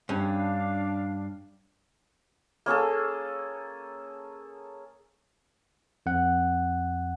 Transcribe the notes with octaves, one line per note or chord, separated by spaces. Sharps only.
G2 C#4 D4 F5
A#3 C#4 G#4 A4
F2 F#5